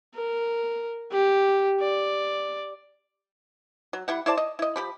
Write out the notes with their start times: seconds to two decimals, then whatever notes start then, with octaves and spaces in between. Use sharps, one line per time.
0.15 A#4
1.11 G4
1.80 D5
3.93 F#3
4.08 G3 E4 F#5
4.26 E4 C5 D5 A5
4.37 D#5
4.59 E4 D#5
4.76 F3 G4 B5